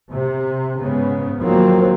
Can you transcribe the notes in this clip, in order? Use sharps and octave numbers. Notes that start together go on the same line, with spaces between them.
C3
G#2 C#3 B3
D#3 F3 F#3 A#3 C4